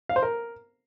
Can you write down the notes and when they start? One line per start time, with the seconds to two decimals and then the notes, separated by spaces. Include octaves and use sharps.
0.09 F5
0.16 C5
0.23 A#4